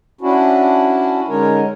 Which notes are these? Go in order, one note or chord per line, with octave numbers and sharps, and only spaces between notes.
C#4 D4 E4 F#4
D3 G#3 C#4 D#4 A#4 C#5